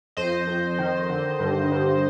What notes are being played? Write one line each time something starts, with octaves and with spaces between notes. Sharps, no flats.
F2 C5 D#5
F2
D#3
D3
G2
G2